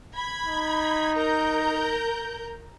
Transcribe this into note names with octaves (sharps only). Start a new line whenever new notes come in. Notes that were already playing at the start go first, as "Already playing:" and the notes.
B5 G#6
D#4
A#4 A#5 G6